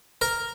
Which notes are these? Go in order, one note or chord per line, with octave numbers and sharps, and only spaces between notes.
A#4